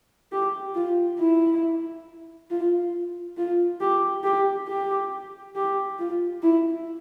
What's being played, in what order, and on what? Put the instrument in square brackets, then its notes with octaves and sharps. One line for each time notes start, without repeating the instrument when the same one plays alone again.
[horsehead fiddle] G4
F4
E4
F4
F4
G4
G4
G4
G4
F4
E4